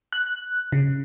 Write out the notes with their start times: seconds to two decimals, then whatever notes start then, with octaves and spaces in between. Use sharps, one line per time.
0.13 F#6
0.72 C#3